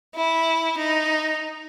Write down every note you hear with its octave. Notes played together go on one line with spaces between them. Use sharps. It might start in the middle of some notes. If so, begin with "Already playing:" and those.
E4
D#4